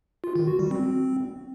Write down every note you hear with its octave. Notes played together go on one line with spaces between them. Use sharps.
F4
D#3
F#4
G3
C4